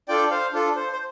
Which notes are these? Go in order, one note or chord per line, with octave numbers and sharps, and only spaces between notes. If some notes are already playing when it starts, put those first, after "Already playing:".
D4 F4 A4 D5 G5
C5 F5
D4 F4 A4
C5
C5